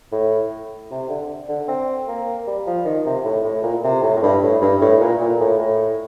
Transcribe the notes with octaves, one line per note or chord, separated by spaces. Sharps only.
A2
C3
D3
D3
C4
A#3
G3
F3
D#3
C3
A2
A2
A#2
C3
A2
A2
G2
A2
G2
A2
A#2
A#2
A2
A2